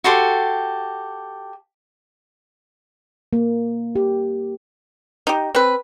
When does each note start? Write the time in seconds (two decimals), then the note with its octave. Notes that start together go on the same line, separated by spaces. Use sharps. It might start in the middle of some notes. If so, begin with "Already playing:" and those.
0.04 F#4 G4 A4 C6
3.33 A#3
3.96 G4
5.27 D#4 G4
5.55 C4 B4